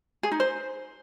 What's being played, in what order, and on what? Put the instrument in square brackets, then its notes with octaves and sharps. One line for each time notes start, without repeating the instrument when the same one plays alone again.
[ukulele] G#4
D#4
C5